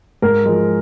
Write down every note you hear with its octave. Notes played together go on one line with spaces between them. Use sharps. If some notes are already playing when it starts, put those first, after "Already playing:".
G#2 A#4
F3 G#3